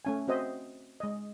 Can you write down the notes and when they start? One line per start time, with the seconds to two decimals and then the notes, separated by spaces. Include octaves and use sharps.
0.05 A3 C#4 G#5
0.28 C4 F#4 C5 D#5 E5
1.00 G#3 D#5